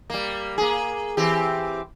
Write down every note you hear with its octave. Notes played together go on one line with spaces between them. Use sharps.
G3 A#3
A#3 G#4
E3 C4 G4